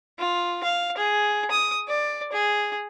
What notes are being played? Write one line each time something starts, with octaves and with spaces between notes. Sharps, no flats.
F4
F5
G#4
D#6
D5
G#4